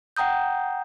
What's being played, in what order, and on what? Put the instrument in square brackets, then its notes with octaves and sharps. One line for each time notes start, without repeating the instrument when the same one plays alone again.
[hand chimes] F#5 G5 A#5 D#6 G6